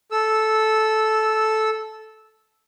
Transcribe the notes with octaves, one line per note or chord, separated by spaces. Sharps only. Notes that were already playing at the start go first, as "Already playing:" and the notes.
A4 E6